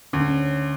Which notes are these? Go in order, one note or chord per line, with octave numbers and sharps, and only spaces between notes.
D2 C#4
D4
C#4